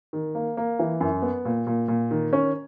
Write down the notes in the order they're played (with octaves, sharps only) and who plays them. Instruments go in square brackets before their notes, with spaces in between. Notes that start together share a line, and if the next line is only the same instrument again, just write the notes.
[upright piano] D#3
A#3
A#3
E3
F#2
B3
A#2
A#2
A#2
D#3
C#4